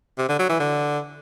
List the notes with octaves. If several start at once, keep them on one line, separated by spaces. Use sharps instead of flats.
C3
D3
F#3
E3
D3